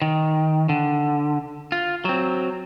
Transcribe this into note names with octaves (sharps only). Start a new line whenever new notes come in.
D#3
D3
F4
F#3 C4